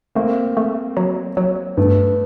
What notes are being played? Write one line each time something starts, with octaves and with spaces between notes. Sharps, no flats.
A3 A#3 C4
A3
F#3
F#3
G2 A3 B3